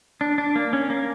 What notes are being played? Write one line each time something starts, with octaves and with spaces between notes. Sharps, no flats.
D4
D4
A#3
C#4
A#3